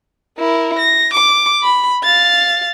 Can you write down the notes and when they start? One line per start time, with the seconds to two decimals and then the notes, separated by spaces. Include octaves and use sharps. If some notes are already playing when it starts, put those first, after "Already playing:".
0.38 E4 A#4
0.78 A#6
1.13 D6
1.63 B5
2.04 F5 A6